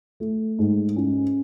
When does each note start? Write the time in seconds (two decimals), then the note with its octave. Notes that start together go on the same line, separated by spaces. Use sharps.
0.20 A3
0.59 G#2
0.96 C#4